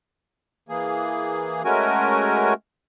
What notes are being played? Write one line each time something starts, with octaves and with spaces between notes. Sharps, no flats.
E3 A#3 G#4
G#3 A3 C#4 F#4 A#4 G#5